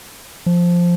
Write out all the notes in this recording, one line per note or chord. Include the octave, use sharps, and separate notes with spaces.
F3